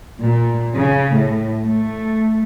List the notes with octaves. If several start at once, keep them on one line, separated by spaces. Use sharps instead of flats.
A#2
C#3
A2
A3